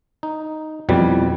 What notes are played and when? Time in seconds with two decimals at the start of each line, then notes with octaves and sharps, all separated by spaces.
0.23 D#4
0.89 F2 B2 E3 G3